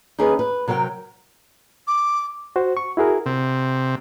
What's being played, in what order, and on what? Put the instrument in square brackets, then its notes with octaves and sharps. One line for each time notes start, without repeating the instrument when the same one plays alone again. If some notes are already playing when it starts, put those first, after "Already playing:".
[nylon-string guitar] D#2 D#3 C#4 G#4 B4 D#5
B4
C3 F#3 A#4 C5 G5
[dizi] D6
[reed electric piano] F#4 C5
C#6
E4 F#4 G#4 A#4
[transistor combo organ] C3